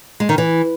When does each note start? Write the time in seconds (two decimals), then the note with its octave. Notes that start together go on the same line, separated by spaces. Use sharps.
0.20 G#3
0.29 D#3
0.38 E3